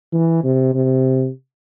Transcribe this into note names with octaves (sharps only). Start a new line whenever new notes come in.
E3
C3
C3